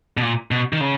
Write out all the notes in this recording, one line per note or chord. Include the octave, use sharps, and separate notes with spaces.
B2
A#2
B2
D#3
C#3